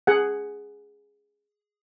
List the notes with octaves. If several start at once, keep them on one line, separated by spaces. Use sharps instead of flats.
G#4 F#5